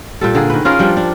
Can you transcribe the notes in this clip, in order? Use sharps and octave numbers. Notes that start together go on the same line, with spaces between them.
A#2 G3 A4
D3 A#3 G#4
D#3 B4
C#4 F4 G#4 A#4
F3 G3 D4
D4